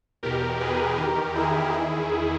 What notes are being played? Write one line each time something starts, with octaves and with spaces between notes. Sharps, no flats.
E2 B2 G4 A#4
G#4 B4
E2 D#3 G4 A#4
E4 G#4
E2 D#3 E4 G#4